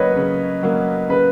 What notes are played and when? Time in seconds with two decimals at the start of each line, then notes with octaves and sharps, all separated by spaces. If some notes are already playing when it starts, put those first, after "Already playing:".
Already playing: C#3 F#3 A#3 B4 C#5 D#5
0.16 C#3
0.63 F#3 A#3
1.09 C#3 B4